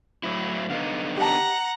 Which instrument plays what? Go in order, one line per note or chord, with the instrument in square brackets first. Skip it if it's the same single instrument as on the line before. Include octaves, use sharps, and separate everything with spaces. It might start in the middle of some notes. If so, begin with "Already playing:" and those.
[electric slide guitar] A2 F#3 E4
[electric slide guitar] D3 B3 D#4 [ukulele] F5
[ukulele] G4 D#5 A5 [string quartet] F#5 A#5